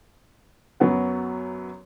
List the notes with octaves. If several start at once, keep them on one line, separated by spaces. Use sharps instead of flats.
F#2 F#3 B3 F#5